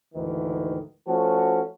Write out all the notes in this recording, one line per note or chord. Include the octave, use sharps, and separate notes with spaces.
D2 G#2 D#3 E3
F3 A3 C#4 F#4 A4